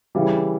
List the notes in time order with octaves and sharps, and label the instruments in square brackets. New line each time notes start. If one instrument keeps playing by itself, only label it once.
[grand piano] C#3 E3 G3